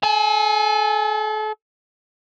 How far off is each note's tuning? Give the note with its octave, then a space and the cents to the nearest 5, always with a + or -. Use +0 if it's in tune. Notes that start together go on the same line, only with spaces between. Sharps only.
A4 -35 G#5 +0